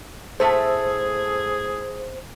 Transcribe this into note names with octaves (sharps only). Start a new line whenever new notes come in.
A2 A3 G#4 A4 C5